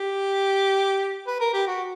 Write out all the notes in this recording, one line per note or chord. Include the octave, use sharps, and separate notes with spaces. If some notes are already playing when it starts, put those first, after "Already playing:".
Already playing: G4
B4
A#4
G4
F#4